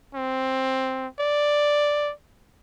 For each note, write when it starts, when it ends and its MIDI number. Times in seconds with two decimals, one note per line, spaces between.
0.15 1.07 60
1.19 2.12 74